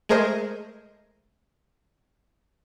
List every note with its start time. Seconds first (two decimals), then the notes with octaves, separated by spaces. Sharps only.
0.09 G#3 A3 G#4 A#4 C5 D#5